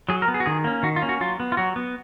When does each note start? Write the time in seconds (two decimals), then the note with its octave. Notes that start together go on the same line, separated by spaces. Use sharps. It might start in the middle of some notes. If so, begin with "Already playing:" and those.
0.09 F#3 G#4
0.22 A#4
0.28 B3
0.34 G#4
0.40 F#4
0.46 D#3 G#4
0.64 A#3 C#4
0.83 D#3 F#4
0.96 F4
1.02 A#3 C#4
1.09 F#4
1.21 F#3 F4
1.40 B3
1.52 F4
1.57 F#3 F#4
1.76 B3